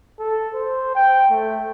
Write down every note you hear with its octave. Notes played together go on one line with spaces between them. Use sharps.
A4
C5
G5
A3